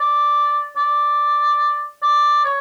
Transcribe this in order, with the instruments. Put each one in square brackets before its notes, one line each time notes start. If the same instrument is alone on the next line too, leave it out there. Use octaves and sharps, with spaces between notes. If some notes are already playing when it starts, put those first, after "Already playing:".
Already playing: [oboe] D5
D5
D5
C#5